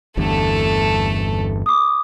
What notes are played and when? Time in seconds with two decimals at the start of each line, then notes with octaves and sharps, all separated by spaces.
0.17 G1 E2 G2 A3 A4
1.66 D6 D#6